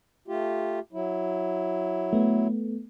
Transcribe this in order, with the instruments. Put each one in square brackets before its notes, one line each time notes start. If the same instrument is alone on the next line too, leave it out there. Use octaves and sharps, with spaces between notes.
[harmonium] A3 F4 G4
F#3 E4
[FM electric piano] A3 B3